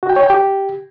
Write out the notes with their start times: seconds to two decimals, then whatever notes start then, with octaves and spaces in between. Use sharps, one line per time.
0.03 F#4
0.10 G5
0.16 C#5
0.23 G5
0.30 G4